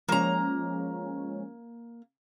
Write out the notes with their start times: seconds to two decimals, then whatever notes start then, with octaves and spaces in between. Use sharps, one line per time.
0.09 F3 G#3 A#3 C#4 A#5